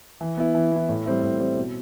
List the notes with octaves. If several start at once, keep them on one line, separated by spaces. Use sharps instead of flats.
E3
B3 E4
E3
B3 E4
A2
G3 C4 E4
A2
G3 C4 E4
B2